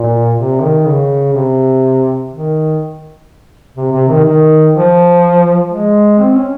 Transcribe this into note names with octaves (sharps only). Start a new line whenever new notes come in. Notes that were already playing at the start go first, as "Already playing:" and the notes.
Already playing: A#2
C3
D#3
C#3
C3
D#3
C3
C3
D#3
D#3
F3
G#3
C4
C#4